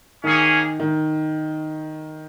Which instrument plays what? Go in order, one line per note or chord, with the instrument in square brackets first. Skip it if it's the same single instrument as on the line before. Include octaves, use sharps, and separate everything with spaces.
[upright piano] D#3 [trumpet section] A#3 C#4 G#4
[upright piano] D#3